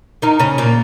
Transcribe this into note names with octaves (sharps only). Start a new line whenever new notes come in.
D#3 D#4
C#3 C#4
A#2 A#3